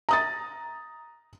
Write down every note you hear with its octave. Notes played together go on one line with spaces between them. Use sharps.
A#5 D#6 A6